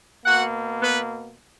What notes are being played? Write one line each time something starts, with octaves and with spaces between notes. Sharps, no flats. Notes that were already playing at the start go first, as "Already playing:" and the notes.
B2 A#3 F#4 F#5
B3 B4